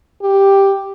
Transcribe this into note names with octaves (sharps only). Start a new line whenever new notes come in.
G4